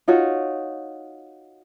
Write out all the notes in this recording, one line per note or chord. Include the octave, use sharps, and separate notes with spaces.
D#4 F4 F#4 C#5